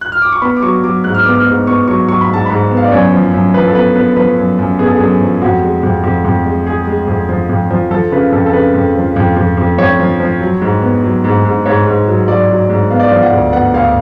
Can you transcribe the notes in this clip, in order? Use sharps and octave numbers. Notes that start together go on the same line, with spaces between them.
F#6
F6
D6
C#6
B3 B5
D6
F#3 C#6
F#3 D6
G#2 F#6
F6
B3 D6
F6
G#2
B3 C#6
F#3 C#6
F#3 C#6
B5
G#2 A5
G#2 B5
B3
F5
D5
F#2 C#5
F3
F#2
F3 B4
A4
B3 B4
B3 B4
F3 B4
F#2
F#2
B3 G#4
A4
F#2 G#4
F3
F2 F#4
G#3
F2
F2
F2
G#3
G#3 G#4
G#3
F2
F3
F2
F3
F3 A4
C#3 B4
F2 A4
A4
C#3 B4
F2
F3
F2
F2
F2
F2 C#5
F3
F3
F#3
G#2
B3
F#3
G#2
G#2
G#2 C#5
G#2
F#3
F#3 D5
F#3
G#2
B3 F5
D5
F3 F5
F#5
D2
B3 F#5
D2 F5